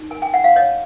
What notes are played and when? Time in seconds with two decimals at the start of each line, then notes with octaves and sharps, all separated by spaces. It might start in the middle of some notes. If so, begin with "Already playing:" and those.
Already playing: D#4
0.10 A#4 G#5
0.22 G5
0.33 F4 F#5
0.44 F5
0.56 C#5 D#5